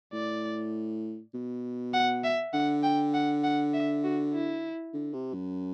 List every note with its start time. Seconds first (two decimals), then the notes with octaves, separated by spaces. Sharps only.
0.13 A2 D5
1.34 B2
1.94 F#5
2.24 E5
2.53 D3 F#5
2.84 G5
3.14 F#5
3.44 F#5
3.74 E5
4.04 F#4
4.34 E4
4.94 D3
5.14 C3
5.34 F#2